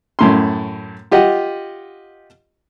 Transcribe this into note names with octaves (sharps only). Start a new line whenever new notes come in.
F#2 A2 C6
F4 G4 D#5 F#5